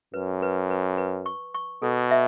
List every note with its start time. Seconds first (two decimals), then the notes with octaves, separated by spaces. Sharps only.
0.14 F#2 B4
0.42 B4
0.70 B4
0.98 B4
1.26 C#6
1.54 C#6
1.82 B2 A4
2.11 E5